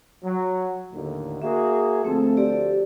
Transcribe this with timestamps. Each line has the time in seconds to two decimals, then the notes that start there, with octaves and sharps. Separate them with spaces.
0.24 F#3
0.93 D#2 A2 D3
1.42 A#3 F#4 G#4 E5
2.05 D2 F3 A3 C4 A4
2.37 G4 D5